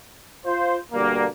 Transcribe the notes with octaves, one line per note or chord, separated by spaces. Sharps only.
F4 C5
B2 D3 G3 A#3